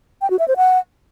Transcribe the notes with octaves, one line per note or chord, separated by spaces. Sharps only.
G5
F#4
E5
C5
F#5